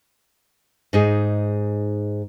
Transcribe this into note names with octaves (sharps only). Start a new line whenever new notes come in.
G#2 D#4 G#4